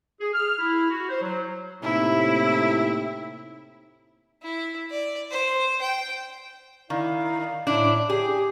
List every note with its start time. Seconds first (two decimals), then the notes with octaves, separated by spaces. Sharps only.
0.20 G#4
0.34 F6
0.59 E4
0.90 F#4
1.09 C5
1.22 F#3
1.83 A2 C3 A#3 D#4 E4
4.42 E4
4.91 D5
5.31 C5
5.81 G5
6.90 D#3 E4 D5 F5
7.67 A2 D4 E4
8.10 G4 G#4